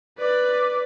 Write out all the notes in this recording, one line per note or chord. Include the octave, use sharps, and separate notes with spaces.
B4 D5